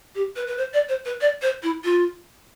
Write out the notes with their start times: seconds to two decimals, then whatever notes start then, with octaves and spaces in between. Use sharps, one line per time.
0.15 G4
0.36 B4
0.47 B4
0.57 C5
0.73 D5
0.89 C5
1.05 B4
1.21 D5
1.42 C5
1.63 E4
1.84 F4